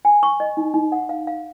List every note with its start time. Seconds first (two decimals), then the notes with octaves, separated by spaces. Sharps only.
0.05 G#5
0.23 C#6
0.40 D#5
0.57 D#4
0.74 D#4
0.92 F#5
1.09 F5
1.27 F5